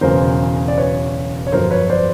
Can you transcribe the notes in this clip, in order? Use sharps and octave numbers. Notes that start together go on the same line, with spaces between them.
E1 E2 C#3 F#3 A#4 C5
D5
B4 C#5
C#5
G1 F2 D3 F#3 A#4 C5
B4 C#5
C5 D5